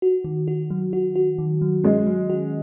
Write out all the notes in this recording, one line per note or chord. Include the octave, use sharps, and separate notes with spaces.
F#4
D#3
F#4
F#3
F#4
F#4
D#3
F#3
G#3 C#4
F#3
F#4